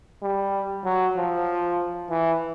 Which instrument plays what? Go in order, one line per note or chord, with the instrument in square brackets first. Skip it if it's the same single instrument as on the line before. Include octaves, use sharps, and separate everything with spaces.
[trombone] G3
F#3
F3
E3